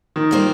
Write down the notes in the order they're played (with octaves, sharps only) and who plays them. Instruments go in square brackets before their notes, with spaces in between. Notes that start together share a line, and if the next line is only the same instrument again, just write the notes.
[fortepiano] D#3
[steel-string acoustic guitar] G3 A#3 F4 C5